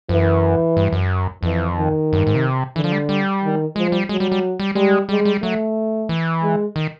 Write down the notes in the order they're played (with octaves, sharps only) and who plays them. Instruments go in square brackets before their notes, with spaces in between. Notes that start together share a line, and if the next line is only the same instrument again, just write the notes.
[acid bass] F#2 [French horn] E3
[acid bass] G2
F#2
[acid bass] F2 [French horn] E3
[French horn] D#3
[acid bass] F#2
G2
G#2
C3
[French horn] D3 [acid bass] E3
[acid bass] F3
G3
G3
[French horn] D#3
[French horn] F3 [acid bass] G#3
[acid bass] G3
[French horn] F#3 [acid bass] G#3
[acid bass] G3
G3
G3
[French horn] G3 [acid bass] G#3
[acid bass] G3 [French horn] G#3
[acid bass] G3
[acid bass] F#3 [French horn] A3
[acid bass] E3
[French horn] G#3
[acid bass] D#3